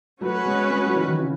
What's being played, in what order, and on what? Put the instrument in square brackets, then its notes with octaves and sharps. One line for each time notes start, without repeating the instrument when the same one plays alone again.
[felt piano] F#3 A3 [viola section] C#4 F#4 B4
[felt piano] G#3 B3
G#3 B3
F#3 A3
E3
D#3 F#3
C#3 E3